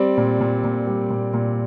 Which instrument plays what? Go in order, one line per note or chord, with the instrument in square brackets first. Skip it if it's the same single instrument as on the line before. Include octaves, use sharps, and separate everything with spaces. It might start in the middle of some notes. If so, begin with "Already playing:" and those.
Already playing: [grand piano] G3 C4 D5
A#2
A#2
A#2
G3
A#2
A#2